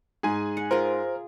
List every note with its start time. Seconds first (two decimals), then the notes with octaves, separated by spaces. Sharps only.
0.23 G#2 G#4 G#5
0.57 F#5
0.71 F4 G#4 A#4 C5